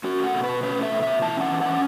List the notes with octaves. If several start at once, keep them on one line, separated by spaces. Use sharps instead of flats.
C#4 F#4
A3 F#5
B2
B4
B2
C#4 B4
A3 E5
B2
B2 E5
E3 A5
C#4 F#5
E3
C#4 F#5